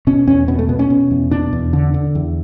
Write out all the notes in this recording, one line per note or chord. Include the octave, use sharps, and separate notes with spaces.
B2 C#4
E2 C#4
B2 B3
A3
B2 B3
C#4
B2
E2
B2 D4
E2
D3
D3
E2